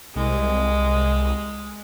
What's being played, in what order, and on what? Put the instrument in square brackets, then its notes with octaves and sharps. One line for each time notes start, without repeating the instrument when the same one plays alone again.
[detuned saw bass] C2 [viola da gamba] G#3